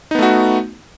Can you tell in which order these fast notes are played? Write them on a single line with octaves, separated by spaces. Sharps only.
D#4 B3 A3 F#4